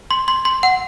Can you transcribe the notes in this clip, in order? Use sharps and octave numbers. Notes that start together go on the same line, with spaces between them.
C6
C6
C6
F#5